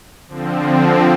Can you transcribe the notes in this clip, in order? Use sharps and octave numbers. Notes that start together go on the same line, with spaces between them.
D3 F3 C4